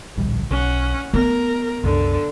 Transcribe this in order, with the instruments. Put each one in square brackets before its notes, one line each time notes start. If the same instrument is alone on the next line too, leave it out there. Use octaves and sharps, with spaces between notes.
[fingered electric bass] D1 A#1 G3
[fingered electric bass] B1 [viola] C#4 F#5
[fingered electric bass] A3 [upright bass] B3 [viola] A#4
[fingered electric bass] C2 F#2 [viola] D3